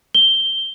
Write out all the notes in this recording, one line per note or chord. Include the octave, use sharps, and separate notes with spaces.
G7